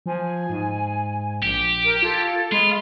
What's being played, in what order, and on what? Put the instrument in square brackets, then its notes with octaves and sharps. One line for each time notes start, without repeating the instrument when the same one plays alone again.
[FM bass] F3 [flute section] G#5
[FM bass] G#2
[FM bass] A#1 [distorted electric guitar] G4
[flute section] A#4
[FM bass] F4 [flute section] A4 F5 G#6
[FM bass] G#3 [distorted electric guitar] F4 [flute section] B5